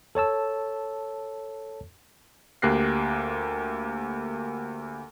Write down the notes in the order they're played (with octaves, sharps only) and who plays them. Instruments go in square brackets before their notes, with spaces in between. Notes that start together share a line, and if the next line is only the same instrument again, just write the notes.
[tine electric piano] A4 C#5 A5 E6
[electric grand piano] D2 A#3 G4 F#6 A#6 C7